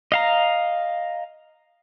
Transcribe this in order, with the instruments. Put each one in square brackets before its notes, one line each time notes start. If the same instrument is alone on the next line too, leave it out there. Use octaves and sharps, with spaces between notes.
[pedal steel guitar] D#5 F5 A#5